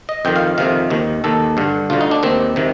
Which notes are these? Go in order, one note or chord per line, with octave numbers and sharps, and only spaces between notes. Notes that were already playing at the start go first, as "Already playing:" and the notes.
D#5
F2 D#3 G5
F5
F2 C3 D#3 F5
D#2 D#3
D#2 D#3 A4
G2 D3
D2 D3 F4
D#4
D4
D#2 D#3 C4
C3 D#3